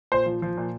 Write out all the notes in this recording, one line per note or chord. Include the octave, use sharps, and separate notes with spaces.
A#2 C5
F3
F3
A#2